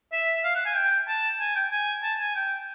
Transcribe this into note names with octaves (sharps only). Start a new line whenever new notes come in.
E5
F5
F#5
G#5
G5
A5
G#5
G5
G#5
A5
G#5
G5